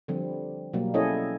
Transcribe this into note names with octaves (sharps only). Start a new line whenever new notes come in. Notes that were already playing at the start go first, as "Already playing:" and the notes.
D3 F3 G3 C4
B2 F#3 G3 A#3
C#4 E4 G#4 A4 C#5 D#5